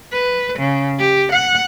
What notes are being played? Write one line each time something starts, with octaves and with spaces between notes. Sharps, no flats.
B4
C#3
G4
F#5